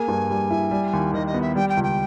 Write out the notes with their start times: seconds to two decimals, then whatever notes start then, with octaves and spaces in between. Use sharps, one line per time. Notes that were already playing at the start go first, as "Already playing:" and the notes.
Already playing: A#3 G#4 G#5
0.08 G2
0.30 G3
0.50 E4
0.71 G3
0.93 D#2
1.14 D#3 D#5
1.27 D#5
1.34 B3
1.42 E5
1.55 G3 G5
1.69 G5
1.77 C#2
1.83 G5